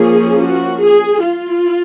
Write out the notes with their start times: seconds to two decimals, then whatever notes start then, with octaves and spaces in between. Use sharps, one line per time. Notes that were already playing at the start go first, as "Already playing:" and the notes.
Already playing: F3 A#3 C#4 G#4
0.46 F#4
0.85 G#4
1.23 F4